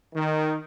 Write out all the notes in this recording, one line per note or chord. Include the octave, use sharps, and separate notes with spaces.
D#3